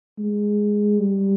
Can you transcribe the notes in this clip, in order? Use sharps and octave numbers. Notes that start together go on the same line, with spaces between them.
G#3
G3